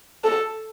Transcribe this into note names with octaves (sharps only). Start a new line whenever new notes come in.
A4